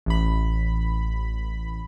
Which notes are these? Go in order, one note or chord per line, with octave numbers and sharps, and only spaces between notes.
A1 B5